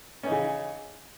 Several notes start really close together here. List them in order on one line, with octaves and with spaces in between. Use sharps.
C#4 D#4 E3 C#3